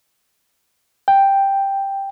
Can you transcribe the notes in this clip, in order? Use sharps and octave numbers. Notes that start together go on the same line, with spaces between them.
G5